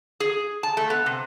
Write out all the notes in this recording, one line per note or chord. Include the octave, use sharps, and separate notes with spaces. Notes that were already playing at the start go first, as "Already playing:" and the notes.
G#4
A5
A3
B3
C3